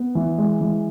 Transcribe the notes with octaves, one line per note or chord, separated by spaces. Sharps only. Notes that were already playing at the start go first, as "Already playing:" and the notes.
Already playing: B3
E3
G#3
E3